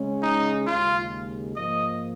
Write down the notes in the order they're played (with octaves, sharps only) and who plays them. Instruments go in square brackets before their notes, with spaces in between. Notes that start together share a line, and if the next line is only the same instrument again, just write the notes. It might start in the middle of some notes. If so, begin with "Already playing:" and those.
Already playing: [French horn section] C#3 G#3 C#4
[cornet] D#4
[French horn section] D#2 C#3 G#3 [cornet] F4
[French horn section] G#2 F3 A#3 [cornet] D#5